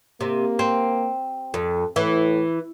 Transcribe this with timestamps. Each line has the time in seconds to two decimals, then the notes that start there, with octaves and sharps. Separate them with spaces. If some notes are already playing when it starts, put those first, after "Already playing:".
0.21 C3 A#3
0.59 C4
1.54 F2 A4
1.96 A2 E3